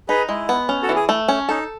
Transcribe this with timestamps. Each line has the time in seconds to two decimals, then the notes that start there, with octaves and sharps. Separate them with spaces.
0.09 D#4 G#4 B4
0.29 G#3 E4
0.49 B3
0.69 C#4
0.83 F#4 A4
0.89 E3
0.96 G#4
1.09 A3
1.28 C#4
1.49 D#4 A4